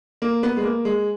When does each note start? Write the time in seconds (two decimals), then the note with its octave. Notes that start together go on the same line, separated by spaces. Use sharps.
0.22 A#3
0.43 B3
0.57 G#3
0.63 A#3
0.85 G#3